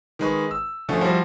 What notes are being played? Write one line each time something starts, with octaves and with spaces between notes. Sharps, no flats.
D#3 G#3 B4 C#6
E6
B2 D3 F3 A3 C#4
F3 G3 E4 F#4